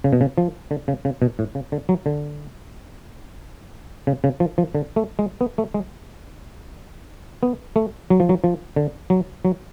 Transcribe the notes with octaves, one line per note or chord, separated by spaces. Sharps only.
C#3
B2
C#3
F3
D3
C#3
C#3
B2
A2
C#3
D3
F#3
D3
C#3
C#3
F3
F3
D3
A3
G#3
B3
A3
G#3
B3
A3
F#3
F3
F#3
F3
D3
F#3
F#3